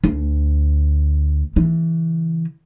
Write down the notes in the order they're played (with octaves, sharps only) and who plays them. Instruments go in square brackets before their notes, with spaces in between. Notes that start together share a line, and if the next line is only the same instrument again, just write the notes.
[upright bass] D2
C#3 E3